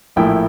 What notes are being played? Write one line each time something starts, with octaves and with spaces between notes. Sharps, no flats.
A#1 A2 F3 A#3 E4 G5